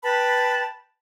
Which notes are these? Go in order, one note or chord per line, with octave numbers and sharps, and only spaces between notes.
B4 G5 A5 B5